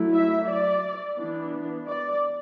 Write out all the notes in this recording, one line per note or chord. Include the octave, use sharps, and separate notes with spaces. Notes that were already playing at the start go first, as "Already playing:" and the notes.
Already playing: F#3 A3 E4
E5
D5
E3 B3 D4
D5